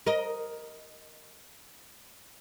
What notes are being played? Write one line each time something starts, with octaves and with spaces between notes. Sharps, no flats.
A#4 D#5